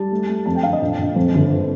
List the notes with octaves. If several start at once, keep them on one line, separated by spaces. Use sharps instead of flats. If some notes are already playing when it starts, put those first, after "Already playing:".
Already playing: G3 A5
A3
A3
F2 A5
G5
D3 F5
D#5
A#1
A#1
F2
G1